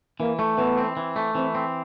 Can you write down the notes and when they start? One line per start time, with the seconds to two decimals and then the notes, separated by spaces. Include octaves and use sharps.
0.20 E3 A#3
0.39 A3
0.58 E3 B3
0.78 C4
0.97 E3
1.16 A3
1.35 E3 C4
1.55 C4